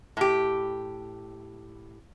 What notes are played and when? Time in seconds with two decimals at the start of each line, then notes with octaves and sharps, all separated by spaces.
0.17 A2 G4